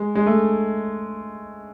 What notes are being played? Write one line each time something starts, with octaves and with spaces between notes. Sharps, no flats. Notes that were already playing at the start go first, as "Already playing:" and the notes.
Already playing: G#3
G#3
A3